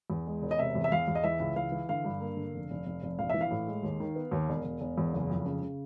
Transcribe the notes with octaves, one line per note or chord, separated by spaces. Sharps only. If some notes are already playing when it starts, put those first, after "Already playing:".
E2
G#3
E1
D#5
C3 E5
E2
E5
E2 F5
E2
D#5
E3 E5
C#2
E3 F5
E3
D3 F5
G2
A#3
D3
F1
F1
F1
F1
A#1 F5
E3 E5
F5
A2
G#3
D#2
D#3
B3
D#2
E1
E1
E1
E2
F#1
F2
C#3
C#3